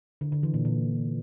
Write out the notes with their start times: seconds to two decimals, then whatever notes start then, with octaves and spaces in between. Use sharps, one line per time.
0.21 D3
0.32 D3
0.43 E3
0.54 A#2
0.65 A#2